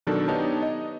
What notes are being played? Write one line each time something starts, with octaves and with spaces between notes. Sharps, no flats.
B2 D#3 F#3 D4 A4
B3 D4 D#4 G4 C#5 A5
D#5